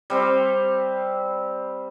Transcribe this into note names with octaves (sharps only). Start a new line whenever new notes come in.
G3 C4 C6